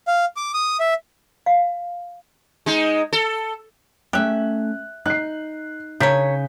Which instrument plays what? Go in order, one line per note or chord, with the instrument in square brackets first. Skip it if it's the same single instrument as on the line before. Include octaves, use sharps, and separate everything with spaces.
[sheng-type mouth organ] F5
D6
D#6
E5
[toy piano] F5
[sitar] G#3 D#4
A4
[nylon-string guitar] A3 C#4 [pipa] G4 E5 [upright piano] F#6
[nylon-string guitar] D#4 [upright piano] F#6 C7
[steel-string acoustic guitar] C#3 [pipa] D4 A#4 C#5 [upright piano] G6 B6